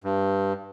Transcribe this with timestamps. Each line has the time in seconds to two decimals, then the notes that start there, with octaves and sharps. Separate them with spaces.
0.04 G2